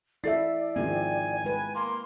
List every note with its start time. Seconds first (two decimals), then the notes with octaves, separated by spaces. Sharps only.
0.24 E4 A4 D5 E5 A6 C7
0.76 G#2 D#3 F3 C4 G#5
1.45 G#3 B4
1.75 A#3 C6